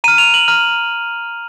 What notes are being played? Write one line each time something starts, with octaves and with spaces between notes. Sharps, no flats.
A#5 F6 D#7
F7
F#7
A#5 F6